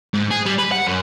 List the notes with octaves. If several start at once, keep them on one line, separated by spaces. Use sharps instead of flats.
G#2
G#4
G3
B4
F#5
F#2